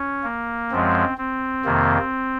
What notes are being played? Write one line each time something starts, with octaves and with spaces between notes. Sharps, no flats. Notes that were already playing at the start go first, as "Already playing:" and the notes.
Already playing: C#4
A#3
F#2 F3 G#3 C4
C4
F2 C3 D#3 A#3